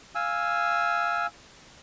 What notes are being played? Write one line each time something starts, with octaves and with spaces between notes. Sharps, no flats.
F5 G#5 E6